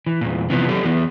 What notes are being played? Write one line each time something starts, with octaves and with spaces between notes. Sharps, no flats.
E3
E2 A#2
C3 E3 F3 B3
F#3 G4 A4
E3 B3